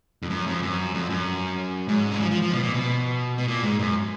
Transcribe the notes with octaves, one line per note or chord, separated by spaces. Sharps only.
F2
F#2
F2
F#2
F2
F#2
G#2
F#3
F3
F3
F3
B2
A#2
B2
B2
A#2
G#2
F#2